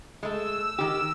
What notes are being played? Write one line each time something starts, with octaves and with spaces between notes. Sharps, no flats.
G#3 A3 E6
D#3 G4